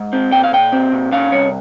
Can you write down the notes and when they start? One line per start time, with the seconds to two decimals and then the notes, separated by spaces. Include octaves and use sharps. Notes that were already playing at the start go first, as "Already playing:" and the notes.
Already playing: G#2
0.13 C4
0.32 A#2 G5
0.43 F5
0.52 A#2 G5
0.72 C4
0.92 A#2
1.12 C#4 F5
1.32 C2 C#5